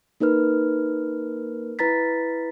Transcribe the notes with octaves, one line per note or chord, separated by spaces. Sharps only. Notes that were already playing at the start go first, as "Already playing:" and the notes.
A#3 D#4 A#4 B4 F6
E4 B4 A#5 A6 B6